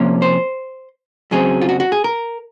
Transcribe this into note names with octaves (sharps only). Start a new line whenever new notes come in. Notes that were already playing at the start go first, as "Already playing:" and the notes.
Already playing: C3 F3 A#3 C#4
C5
F#2 C#3 F#3 C4 G#4
F4
F#4
F#4
G#4
A#4